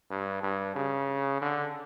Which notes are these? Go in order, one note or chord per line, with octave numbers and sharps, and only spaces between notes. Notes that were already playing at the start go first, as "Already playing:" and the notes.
G2
G2
C#3
D3